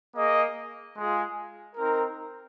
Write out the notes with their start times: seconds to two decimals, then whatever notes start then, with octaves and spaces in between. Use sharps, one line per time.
0.15 A#3 G#4 D#5
0.95 G#3 F4 G#4
1.76 C4 D#4 A#4